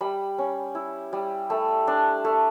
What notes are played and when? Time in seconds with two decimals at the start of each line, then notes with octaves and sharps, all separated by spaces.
0.01 G3 B5
0.38 C#4
0.75 E4
1.13 G3
1.50 A3 B5
1.87 D4
2.25 A3